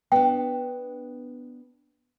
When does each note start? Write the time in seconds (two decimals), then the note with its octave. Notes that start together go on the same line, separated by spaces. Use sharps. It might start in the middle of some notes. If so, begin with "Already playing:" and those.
0.12 B3 D4 G5